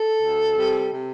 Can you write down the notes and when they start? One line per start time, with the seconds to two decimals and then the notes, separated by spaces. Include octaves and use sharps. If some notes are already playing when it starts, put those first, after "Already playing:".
Already playing: A4
0.20 D2
0.55 C3 G3
0.90 C3